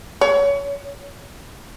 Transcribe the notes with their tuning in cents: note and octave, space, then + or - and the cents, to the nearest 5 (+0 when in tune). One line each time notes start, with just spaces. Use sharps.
C#5 +25